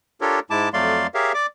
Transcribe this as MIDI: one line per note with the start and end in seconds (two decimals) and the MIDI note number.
0.21 0.40 62
0.21 0.40 65
0.21 0.40 67
0.21 0.40 69
0.21 0.40 70
0.21 0.40 73
0.50 0.69 44
0.50 0.69 56
0.50 0.69 64
0.50 0.69 81
0.50 0.69 86
0.73 1.07 41
0.73 1.07 54
0.73 1.07 57
0.73 1.07 74
0.73 1.07 77
0.73 1.07 84
1.14 1.32 67
1.14 1.32 68
1.14 1.32 70
1.14 1.32 73
1.14 1.32 76
1.14 1.32 77
1.34 1.46 74
1.34 1.46 86